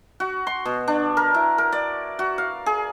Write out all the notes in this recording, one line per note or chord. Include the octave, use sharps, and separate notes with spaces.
F#4
C6
B2
D4
A#4
E4
A#4
D5
F#4
F5
G#4